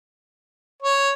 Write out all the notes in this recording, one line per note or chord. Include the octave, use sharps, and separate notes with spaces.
C#5